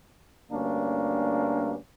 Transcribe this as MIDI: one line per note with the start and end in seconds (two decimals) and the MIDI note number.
0.52 1.75 38
0.52 1.75 43
0.52 1.75 58
0.52 1.75 61
0.52 1.75 62